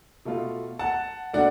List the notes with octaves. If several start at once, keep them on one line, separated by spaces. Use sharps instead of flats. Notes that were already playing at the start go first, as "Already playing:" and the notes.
B2 A3 F4
F#5 A5
B2 A3 D4 D5 F#5